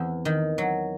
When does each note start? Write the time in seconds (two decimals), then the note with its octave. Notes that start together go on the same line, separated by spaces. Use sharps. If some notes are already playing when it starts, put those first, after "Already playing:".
Already playing: E2 C4
0.25 D#3
0.58 F#3